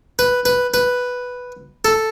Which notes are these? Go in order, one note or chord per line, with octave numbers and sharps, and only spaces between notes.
B4
B4
B4
A4